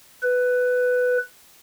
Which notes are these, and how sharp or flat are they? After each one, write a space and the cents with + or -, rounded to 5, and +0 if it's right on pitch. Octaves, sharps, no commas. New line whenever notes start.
B4 +10